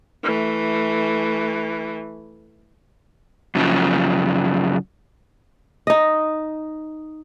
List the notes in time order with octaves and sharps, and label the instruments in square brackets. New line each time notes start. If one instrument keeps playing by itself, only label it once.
[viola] E3 A3
[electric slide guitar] F#2 C#3 F3
[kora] D#4 D#5